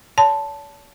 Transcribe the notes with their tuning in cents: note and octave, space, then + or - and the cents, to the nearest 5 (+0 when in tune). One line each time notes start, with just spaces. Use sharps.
C#5 +45 A5 +0 C6 -40